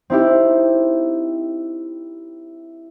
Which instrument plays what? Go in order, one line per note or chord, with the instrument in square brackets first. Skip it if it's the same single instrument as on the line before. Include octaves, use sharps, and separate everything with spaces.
[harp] C4 D#4 E4 G4